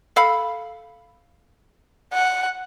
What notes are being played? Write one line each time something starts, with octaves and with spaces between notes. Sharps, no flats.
A4 F5 B5
F#5